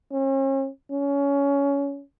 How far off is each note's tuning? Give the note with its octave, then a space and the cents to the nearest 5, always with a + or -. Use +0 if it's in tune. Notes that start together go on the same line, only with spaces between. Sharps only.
C#4 -40
C#4 +20